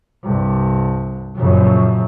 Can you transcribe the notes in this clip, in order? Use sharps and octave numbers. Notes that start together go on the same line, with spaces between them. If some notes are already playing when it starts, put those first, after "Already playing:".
C2 G2
A#1 F#2 C#3